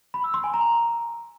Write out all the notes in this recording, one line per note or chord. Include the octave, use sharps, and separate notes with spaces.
B5
E6
C6
G#5
A#5